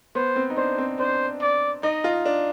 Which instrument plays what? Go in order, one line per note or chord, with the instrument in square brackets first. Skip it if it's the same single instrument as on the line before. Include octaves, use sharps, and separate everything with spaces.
[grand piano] B3 [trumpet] C5
[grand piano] C4
D#4
[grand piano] D4 [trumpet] C5
[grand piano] C4
[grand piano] D4 [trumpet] C5
[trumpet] D5
[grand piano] D#4 [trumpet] D#5
[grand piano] F4
D4